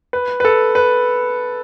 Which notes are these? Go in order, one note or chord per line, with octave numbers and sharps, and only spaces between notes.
B4
B4
A4
B4